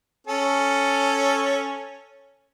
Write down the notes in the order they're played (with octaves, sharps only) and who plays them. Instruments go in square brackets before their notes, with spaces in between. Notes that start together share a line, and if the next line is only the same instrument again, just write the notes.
[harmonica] C#4 A4